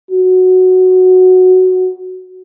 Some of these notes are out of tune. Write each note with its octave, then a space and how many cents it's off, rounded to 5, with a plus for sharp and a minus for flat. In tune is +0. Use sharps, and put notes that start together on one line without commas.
F#4 +0